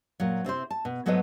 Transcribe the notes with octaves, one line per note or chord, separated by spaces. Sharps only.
A#2 F#3
C3 C4 E4 C5
A5
B2
G#2 F#3 A3 B3 C5 D#5